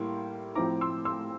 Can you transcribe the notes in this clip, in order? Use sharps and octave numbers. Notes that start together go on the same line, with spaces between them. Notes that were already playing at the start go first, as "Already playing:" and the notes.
Already playing: A2 G3 A#3 E4 C6
A2 F3 C4 E4 A#5 D6
C6 E6
C6 E6